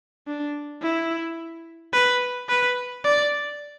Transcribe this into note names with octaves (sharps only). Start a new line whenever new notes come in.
D4
E4
B4
B4
D5